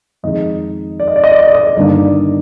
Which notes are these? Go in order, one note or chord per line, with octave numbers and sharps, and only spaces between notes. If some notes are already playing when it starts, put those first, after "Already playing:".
F2 D#3 G#3 D#4 D#5
D5
D#5
D5
D#5
D5
D#5
D5
D#5
D5
G1 G2 D#3 A#3 D4 D5